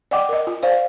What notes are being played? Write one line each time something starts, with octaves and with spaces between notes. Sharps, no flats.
D5 D#5 F#5 G5 D6
A#4 D#5
F4
C5 D5 F5